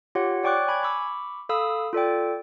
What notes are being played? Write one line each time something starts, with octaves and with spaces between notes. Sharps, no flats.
F4 G4 C#5 F#5
C#5 D5 G5 C#6 D6 F#6
G#5 B5 G#6
B5 C#6 D6 E6
A4 F5 B5 D#6 E6
F4 A4 D5 G5